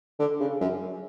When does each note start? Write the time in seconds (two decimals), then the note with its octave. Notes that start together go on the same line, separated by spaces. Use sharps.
0.19 D3
0.40 C#3
0.61 F#2